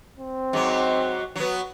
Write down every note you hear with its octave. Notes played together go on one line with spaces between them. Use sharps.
C4
G#2 F#3
F#3 B3